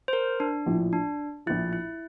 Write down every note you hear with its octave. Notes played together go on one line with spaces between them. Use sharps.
C5
A#4
D4
A#1 A2 F3
D4
A#1 A2 F3 E4
E4